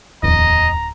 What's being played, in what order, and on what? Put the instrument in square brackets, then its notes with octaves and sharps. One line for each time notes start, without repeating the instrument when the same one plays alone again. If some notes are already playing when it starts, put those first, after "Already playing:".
[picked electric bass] D1 [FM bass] E2 [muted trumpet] D#5 [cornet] A#5